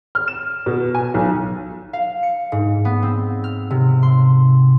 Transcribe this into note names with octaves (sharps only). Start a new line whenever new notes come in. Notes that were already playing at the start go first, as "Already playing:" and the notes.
F6
E7
B2
G#5
B1
F5
C#7
G#2
B3
C4
F6
C3
C6